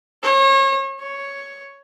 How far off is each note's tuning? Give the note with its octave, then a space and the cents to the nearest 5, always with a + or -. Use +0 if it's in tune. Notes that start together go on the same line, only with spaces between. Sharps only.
C#5 -35
C#5 +5